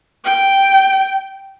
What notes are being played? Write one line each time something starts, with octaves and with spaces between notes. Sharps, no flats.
G5